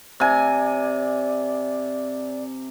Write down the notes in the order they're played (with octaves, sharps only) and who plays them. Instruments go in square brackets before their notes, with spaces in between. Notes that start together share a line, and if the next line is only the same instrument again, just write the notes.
[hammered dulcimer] C3 G#5 [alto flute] D5